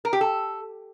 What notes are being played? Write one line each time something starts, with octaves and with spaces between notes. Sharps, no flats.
A#4
G4
A4